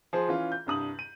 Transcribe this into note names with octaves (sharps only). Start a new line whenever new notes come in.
F3 G#4 C5
E3 C#4 F4
G6
C2 G2 D#6 F#7
D#7